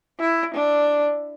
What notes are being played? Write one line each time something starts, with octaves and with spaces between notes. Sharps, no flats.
E4
D4